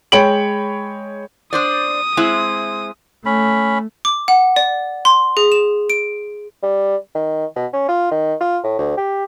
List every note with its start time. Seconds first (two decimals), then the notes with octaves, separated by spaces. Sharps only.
0.12 G#3 C#5 G5 B5 D7 F#7
1.53 D4 C5 D5 D#6
2.17 G#3 C4 E4
3.26 A3 C#4 B5
4.05 D6
4.28 F#5
4.56 D5
5.05 C6
5.37 G#4
5.52 E7
5.90 D7
6.63 G3
7.15 D#3
7.56 B2
7.73 C#4
7.89 F4
8.12 D#3
8.41 F4
8.64 A2
8.79 D2
8.98 G4